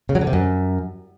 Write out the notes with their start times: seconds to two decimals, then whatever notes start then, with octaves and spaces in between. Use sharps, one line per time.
0.09 C#3
0.15 F#3
0.21 D3
0.27 C3
0.33 F#2